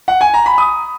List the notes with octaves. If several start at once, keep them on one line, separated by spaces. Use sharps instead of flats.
F#5
G#5
A#5
B5
D#6